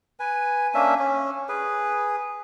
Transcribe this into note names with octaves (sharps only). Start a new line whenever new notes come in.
B4 G#5
A#3 C#4 D4 E5
C#4
G#4 B4